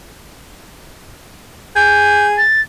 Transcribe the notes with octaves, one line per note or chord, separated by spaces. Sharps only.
G#4 G6
A6